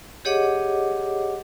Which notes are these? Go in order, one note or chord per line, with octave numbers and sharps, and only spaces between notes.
G4 G#4 C#5 D#5 F#5 D6